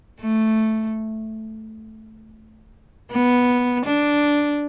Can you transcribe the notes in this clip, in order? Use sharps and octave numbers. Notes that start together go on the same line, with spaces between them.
A3
B3
D4